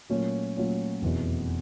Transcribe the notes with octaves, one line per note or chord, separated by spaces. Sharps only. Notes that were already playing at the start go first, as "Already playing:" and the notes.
A#2 F#3 A3 C#4 F4
A#2 F#3 A3 C#4 F4
F1 E2 B2